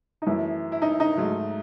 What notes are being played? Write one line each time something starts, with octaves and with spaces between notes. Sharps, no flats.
D#4
F#2 E3 A3 E4
E4
D#4
D#4
G#2 F#3 A3